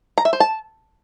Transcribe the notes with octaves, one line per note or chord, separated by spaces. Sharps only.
A#5
E5
C5
A5